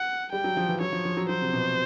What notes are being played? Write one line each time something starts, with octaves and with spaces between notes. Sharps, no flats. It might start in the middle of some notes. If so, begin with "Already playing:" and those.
Already playing: F#5
G3 G5
F#3
F3
E3
F#3 C#5
F3
F3
F#3
F#3 C5
C3
B2